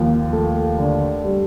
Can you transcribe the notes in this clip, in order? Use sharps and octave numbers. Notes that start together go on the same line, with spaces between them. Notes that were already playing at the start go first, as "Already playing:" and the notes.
Already playing: D#2 F3
A3
D3
G3